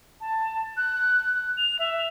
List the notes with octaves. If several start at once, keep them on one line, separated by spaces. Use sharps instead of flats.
A5
F#6
F7
E5